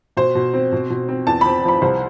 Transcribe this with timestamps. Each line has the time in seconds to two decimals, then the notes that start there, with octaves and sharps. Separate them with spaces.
0.17 B2 C5
0.35 B2
0.53 C4
0.72 B2
0.90 B2
1.09 C4
1.27 E2 A5
1.41 C4 B5
1.64 F3 B5
1.82 C2 C5